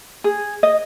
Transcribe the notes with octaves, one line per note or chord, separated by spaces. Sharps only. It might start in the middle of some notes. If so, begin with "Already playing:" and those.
G#4
D#5